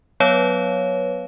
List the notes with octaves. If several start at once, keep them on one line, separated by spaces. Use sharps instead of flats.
F#3 B3 B4 C#5 F5